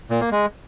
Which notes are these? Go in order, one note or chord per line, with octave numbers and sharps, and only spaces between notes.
A#2
A#3
G#3